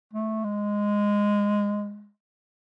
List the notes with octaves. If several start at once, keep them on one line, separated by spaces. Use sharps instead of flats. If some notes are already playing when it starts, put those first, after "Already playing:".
A3
G#3